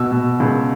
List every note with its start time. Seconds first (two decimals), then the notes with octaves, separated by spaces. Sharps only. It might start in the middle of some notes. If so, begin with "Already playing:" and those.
Already playing: B2 E6
0.12 B2
0.40 C#2